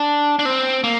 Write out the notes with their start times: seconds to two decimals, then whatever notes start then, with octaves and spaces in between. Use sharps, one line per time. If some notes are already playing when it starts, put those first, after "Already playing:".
Already playing: D4
0.39 D4
0.45 C4
0.84 A#3